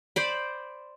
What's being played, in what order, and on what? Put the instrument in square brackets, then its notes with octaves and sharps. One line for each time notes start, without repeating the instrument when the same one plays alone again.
[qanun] C5 D5 B5